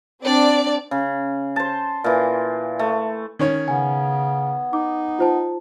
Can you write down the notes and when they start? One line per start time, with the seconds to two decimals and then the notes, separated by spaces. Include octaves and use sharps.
0.23 C4 D4 D5
0.91 C#3
1.56 C5 A5
2.04 A#2 E3
2.79 A3
3.39 D#3 C#4 C#5
3.68 C#3 B3 G#5
4.73 D#4 D6
5.19 F4 C5 A5